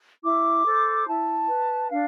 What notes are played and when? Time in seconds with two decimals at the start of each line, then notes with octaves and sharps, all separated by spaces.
0.24 E4 D6
0.66 A4 C5
1.07 E4 A5
1.48 B4
1.90 D4 F5